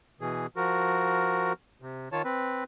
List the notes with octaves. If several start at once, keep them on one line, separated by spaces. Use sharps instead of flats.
B2 E3 G#4
F3 F#4 A#4
C3
D#3 F4 C#5 A5
C4 B4